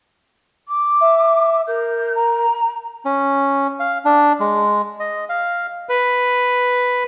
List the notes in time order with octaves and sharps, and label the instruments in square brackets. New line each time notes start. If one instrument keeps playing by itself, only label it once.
[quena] D6
[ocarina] E5
[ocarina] A#4 [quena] G6
[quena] A#5
[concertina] C#4
F5
D4
G#3
D#5
F5
[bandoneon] B4